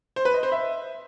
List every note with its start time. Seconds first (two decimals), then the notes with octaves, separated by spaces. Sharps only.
0.16 C5
0.25 B4
0.34 D#5
0.43 C5
0.52 E5